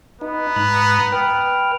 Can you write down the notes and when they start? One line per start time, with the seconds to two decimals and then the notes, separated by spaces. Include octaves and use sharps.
0.21 B3 D#4
0.56 G#2 A#5 F#6
1.12 B4 G5 F6